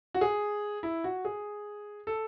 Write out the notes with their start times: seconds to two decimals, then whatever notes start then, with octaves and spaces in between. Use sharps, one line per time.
0.14 F#4
0.21 G#4
0.83 E4
1.04 F#4
1.25 G#4
2.07 A4